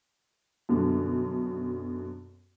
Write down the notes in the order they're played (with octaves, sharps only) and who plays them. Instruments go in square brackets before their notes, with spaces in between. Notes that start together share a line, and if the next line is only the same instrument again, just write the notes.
[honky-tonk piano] F#2 B2 D3 G3